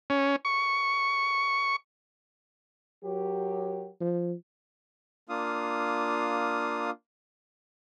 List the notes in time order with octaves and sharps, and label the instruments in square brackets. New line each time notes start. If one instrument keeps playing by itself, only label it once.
[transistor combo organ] C#4
C#6
[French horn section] F#3 G4 A#4
[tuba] F3
[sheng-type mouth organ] A#3 D4 F4 F5 D#6